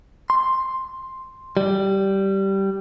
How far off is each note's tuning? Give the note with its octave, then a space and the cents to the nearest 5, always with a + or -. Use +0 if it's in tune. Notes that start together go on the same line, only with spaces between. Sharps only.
C6 +5
G3 -10